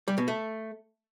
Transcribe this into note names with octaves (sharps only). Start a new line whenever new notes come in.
G3
B2
A3